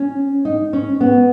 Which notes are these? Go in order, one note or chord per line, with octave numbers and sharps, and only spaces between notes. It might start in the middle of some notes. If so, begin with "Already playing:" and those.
Already playing: C#4
D#4
C#4
B3